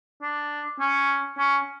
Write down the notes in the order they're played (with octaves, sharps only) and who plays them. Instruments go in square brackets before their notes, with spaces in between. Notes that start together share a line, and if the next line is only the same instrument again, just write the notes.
[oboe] D4
C#4
C#4